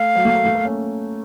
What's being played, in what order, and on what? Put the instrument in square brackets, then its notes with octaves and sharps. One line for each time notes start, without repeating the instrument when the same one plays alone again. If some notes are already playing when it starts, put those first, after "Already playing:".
Already playing: [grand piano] A3 [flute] F5
[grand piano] F#3
A3
A#3
A3
A#3
C#4